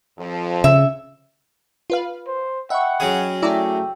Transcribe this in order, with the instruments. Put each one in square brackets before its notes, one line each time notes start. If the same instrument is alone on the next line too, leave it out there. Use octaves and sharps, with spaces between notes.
[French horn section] F2 F3
[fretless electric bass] C#3 [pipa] E5
[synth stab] F4 B4 F5
[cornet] C5
[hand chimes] D#5 G5 B5 [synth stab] E5 C#6 [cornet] F#5
[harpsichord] F#3 C#4 G#4
[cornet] A3 [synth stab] E4 D5 A#5 [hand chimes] G5 D6 E6